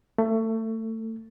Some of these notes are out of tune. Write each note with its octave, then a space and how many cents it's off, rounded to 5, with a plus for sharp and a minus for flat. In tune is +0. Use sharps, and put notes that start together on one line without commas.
A3 +25